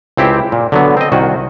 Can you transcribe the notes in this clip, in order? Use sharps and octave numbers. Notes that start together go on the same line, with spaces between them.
C#2 C4 E4 G4
A#2
D3 F#3 B3
C4 D#5
C2 D#3 F#4